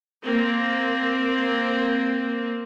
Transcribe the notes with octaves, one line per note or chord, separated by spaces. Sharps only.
A#3 C4